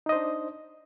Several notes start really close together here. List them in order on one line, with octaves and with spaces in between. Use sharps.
D#4 D#5 C5 D4